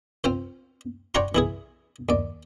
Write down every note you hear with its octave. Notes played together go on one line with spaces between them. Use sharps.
C4 F4 C5
C#5 D5 F#5 G5 A#5 C6
E3 E4 G#4
D#2 D5